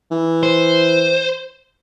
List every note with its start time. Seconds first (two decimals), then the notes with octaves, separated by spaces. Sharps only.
0.11 E3
0.43 C5